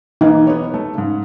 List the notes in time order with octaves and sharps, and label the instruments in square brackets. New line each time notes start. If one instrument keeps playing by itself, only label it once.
[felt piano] B1 E3 A#3 [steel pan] D#4
[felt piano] B3 G4 C#5
A3
G#2 C#3